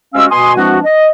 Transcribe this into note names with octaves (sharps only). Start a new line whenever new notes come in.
C3 G#3 C#4 F#4 F5 E6
B2 G#5 C6 D#6
E3 F3 G#3 C4 D4 F#4
D#5